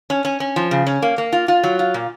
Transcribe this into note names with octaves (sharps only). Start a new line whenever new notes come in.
C#4
C#4
C#4
F3
C#3
C#4
A#3
A#3
F4
F4
F#3
F4
A#2